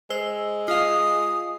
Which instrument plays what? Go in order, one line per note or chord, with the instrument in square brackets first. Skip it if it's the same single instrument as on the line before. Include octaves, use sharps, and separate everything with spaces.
[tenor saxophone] G#3 [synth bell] C5 E6 G7
[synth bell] F4 D#5 F5 [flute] D#6